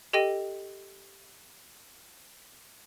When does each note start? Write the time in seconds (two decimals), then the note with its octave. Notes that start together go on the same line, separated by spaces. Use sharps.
0.13 G4 A4 D#5 G5 A#6 D#7